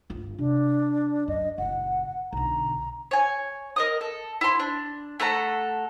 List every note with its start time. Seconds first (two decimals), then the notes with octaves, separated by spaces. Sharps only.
0.10 G1 F4
0.39 C3 D4
1.28 F#2 D#5
1.58 F#1 A#2 F#5
2.33 B1 D3 A#5
3.11 C#5 G#5
3.76 A#4 D#5 D#6
4.01 A4
4.41 E4 C6
4.60 D4
5.20 A3 A4 F#5 A#5